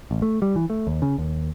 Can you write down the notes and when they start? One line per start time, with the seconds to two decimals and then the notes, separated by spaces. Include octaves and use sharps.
0.11 A1
0.22 A3
0.42 G3
0.56 E3
0.70 A3
0.87 D#2
1.02 C#3
1.18 D#2